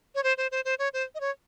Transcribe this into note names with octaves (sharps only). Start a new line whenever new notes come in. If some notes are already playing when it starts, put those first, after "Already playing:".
C#5
C5
C5
C5
C5
C#5
C5
D#5
C#5